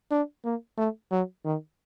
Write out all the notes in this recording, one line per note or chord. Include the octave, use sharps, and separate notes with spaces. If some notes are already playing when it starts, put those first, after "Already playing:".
D4
A#3
A3
F#3
D#3